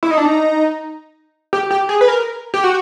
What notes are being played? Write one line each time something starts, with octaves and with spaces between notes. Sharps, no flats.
E4
D#4
D4
D#4
G4
G4
G#4
B4
A#4
G4
F#4